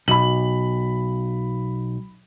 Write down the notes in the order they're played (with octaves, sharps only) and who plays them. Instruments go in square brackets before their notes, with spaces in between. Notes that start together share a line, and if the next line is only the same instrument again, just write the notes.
[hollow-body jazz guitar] B1 [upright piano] B5 F#7